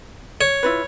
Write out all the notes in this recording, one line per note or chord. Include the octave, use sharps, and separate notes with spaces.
C#5
E4 F4 B4